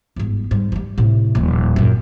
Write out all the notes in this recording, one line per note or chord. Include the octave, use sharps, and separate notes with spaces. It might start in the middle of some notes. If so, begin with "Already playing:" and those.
G1 G#2
G#2 G3
F3 G3
A2 C3
D#1 F3
F#2 A#2